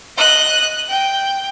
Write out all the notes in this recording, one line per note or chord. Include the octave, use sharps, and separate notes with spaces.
D#5 F#6
G5